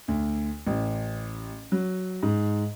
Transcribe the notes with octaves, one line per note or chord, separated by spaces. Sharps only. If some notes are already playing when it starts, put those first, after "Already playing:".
D2
A1
F#3
G#2